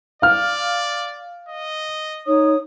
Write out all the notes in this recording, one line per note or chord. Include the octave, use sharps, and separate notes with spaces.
D5 F5 F6
D#5
D#4 C#5 D#6